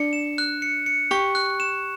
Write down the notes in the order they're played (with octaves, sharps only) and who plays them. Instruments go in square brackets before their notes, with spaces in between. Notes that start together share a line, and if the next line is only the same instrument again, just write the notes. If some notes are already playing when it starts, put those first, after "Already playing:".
Already playing: [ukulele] D4 [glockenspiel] C#7
[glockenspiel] E7
F#6
C#7
C#7
[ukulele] G4 [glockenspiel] C#6
[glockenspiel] F#6
E7